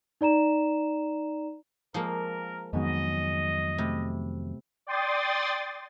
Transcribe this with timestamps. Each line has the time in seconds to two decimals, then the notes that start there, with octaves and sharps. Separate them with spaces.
0.21 D#4 D5 A#5 E7
1.94 F3 G#3 A#3 A#4
2.73 F2 G#2 D#3 F#3 B3 D#5 G#5
3.78 C3 A3 B5
4.87 D5 G5 C6 D#6 A6